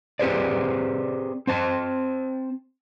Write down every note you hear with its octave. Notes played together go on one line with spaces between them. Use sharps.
C4 G4 G#4 B4 C5 D5
C4 C5 A5